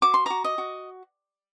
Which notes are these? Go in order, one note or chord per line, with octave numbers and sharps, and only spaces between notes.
F#4 D6
C6
F#4 A#5 D6
D#5
F#4